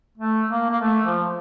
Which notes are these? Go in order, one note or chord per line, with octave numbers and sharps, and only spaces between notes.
A3
A#3
A#3
A3
F3